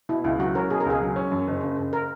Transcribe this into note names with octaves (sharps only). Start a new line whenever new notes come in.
B2 E4
C#2 E4
F#3 F#4
C#4 A#4
B2 G#4
A#4
C#2 G#4
F#3
C#4
F#2
F#1
C#3
F#1
A#4